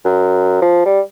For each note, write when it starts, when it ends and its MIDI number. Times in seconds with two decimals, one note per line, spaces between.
0.05 0.57 42
0.62 0.84 53
0.85 1.00 55